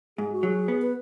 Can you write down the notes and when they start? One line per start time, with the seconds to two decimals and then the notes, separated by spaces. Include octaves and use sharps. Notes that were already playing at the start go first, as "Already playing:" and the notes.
0.18 G#2 G#4
0.32 F#4
0.43 F#3 G#4
0.68 B3
0.82 B4